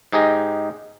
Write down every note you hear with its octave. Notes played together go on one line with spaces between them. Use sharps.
G#2 D#4 G4 G#4 D#5